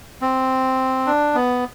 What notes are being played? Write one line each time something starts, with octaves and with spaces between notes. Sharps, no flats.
C4
D4
B3